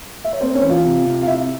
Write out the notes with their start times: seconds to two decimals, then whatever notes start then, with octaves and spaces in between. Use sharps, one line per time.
0.25 E5
0.33 C#5
0.41 A#3 C4 C5
0.55 C#4 C#5
0.63 E3
0.69 F4 F5
0.85 C3
1.06 C3
1.22 F5
1.27 C3 E4 E5